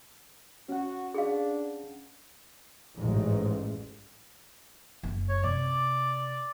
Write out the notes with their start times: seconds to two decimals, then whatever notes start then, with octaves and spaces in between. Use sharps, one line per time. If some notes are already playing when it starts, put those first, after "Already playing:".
0.69 C#4 F#4 F#5
1.14 D4 G#4 F5
2.96 A1 G#2
5.03 F#1
5.29 C#5
5.43 C3 D5